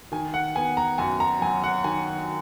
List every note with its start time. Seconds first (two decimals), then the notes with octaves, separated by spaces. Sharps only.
0.12 D#3 G#5
0.34 F#5
0.55 B3 G#5
0.77 A#5
0.98 F#2 G#5
1.20 A#5
1.42 F#3 G#5
1.64 F#5
1.84 D#3 G#5